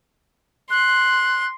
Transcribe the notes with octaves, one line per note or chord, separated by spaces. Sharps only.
C6 F#6